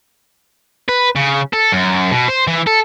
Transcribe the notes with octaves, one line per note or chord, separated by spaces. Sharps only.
B4
C#3
A4
F#2
B2
C5
E3
A4